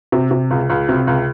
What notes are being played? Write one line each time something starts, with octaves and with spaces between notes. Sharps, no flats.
C3
C3
C#2
C#2
C3
C#2